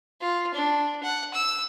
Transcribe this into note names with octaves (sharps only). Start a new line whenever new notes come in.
F4
D4
F#5
E6